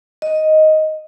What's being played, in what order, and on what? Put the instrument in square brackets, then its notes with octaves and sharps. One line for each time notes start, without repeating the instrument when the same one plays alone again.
[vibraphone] D#5